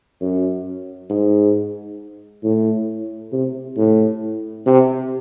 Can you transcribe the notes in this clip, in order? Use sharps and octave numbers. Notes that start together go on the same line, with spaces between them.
F#2
G#2
A2
C3
A2
C3